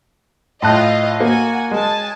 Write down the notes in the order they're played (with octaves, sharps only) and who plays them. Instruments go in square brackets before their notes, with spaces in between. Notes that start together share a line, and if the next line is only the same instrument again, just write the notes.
[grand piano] A2 A5 F#6 [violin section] F4 D#5
[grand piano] A#3 [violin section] F#4 G#5
[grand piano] G#3 [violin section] G#5 A5